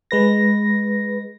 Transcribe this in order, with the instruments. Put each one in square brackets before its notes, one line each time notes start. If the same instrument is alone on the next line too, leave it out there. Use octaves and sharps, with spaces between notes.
[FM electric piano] G#3 B4 A#6